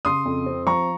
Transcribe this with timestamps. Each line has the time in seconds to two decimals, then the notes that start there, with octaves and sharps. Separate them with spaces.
0.05 C#3 C6 D#6
0.25 F2
0.46 C4
0.67 F3 A#5 C#6